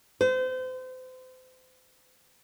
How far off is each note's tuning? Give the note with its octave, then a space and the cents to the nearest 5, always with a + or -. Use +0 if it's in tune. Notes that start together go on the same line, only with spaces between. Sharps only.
C5 -35